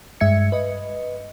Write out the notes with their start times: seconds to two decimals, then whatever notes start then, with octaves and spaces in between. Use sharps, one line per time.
0.20 G2 G#3 E5 G#6 C#7
0.52 B4 D#5